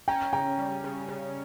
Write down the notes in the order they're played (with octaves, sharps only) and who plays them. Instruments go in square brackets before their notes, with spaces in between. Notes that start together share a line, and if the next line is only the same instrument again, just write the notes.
[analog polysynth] C#4 [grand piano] G5 A#5
[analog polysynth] C#3 [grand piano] G5 A#5
[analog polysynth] G3
C#3
C#3